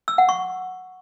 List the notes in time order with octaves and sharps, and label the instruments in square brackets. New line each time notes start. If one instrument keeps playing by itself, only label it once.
[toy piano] E6
F#5
C#6